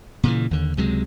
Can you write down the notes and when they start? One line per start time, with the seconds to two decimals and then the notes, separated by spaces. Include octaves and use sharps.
0.23 A#2 C#3 E3
0.51 D#2 D3
0.77 C#2 C3 F#3 G#3